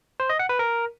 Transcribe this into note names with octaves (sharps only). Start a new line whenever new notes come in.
C5
D#5
F#5
B4
A#4